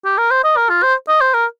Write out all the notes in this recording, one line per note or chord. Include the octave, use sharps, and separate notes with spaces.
G4
A#4
C5
D#5
A#4
F4
C5
D#5
C5
A#4